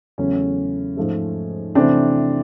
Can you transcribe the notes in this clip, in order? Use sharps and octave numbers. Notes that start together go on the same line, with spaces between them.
E2 C#3 F#3 A3 C#4
G#2 F3 A3
C3 E3 A3 C4 D4